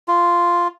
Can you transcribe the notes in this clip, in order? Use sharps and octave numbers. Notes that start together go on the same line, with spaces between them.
F4